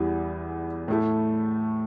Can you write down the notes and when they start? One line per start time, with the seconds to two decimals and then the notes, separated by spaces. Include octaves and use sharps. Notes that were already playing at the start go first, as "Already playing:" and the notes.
Already playing: E2 E3 G3
0.88 A2 A3 E4 A4